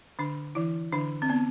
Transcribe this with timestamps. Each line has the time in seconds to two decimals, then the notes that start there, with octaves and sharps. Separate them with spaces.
0.19 D3 D4
0.55 E3 E4
0.92 D3 D4
1.22 C4
1.30 B3